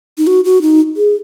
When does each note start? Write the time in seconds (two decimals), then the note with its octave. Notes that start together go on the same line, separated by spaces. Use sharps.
0.18 D#4
0.27 F#4
0.44 F#4
0.62 D#4
0.97 G#4